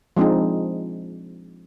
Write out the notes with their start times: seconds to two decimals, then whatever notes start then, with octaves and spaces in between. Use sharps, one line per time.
0.17 F3 G#3 C4 D4 D#4